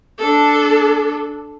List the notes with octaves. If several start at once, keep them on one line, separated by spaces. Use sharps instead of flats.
D4 A4